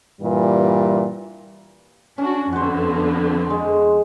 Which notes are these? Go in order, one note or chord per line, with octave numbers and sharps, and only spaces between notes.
G2 A#2 E3 G3
C#4 D4 F#4
F2 D3 B3 F#4 C5
G#3